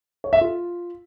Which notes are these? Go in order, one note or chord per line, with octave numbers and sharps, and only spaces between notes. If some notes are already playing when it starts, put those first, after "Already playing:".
C#5
E5
F4